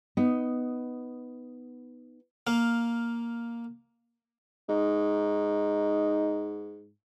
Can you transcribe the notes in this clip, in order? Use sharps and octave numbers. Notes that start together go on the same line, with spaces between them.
B3 D#4
A#3 F5
G#2 D#4